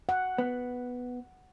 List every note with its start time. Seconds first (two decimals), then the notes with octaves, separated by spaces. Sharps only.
0.09 F#5
0.38 B3